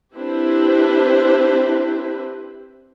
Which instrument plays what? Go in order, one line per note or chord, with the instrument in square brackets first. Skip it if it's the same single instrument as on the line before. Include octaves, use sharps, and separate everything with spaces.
[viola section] C4 D4 E4 G4 B4 C5